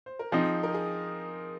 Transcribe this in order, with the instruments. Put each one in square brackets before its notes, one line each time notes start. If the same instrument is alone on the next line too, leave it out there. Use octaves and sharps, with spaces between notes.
[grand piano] C5
A#4
[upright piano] F3 C4 D#4 [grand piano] G#4
[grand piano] A#4
G#4